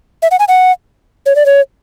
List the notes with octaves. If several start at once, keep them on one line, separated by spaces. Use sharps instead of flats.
E5
F#5
G#5
F#5
C#5
D5
C#5